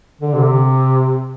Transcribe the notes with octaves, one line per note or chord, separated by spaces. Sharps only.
D3
C3